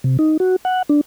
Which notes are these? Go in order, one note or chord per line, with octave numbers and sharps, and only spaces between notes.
C3
D#4
F#4
F#5
D4